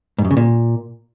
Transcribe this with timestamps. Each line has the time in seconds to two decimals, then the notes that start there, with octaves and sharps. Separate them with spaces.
0.18 G#2
0.25 F#2
0.31 C#3
0.37 A#2